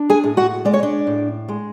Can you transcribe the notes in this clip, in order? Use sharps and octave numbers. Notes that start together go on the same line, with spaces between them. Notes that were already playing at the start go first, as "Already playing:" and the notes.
Already playing: D4
G#4 G#5
A2
F#4 F#5
G#3 D5
C#5
D4 D5
A2
G#3